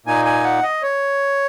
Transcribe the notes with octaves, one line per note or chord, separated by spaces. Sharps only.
A#2 A#3 D#4 G#5
G#5
F#5
D#5
C#5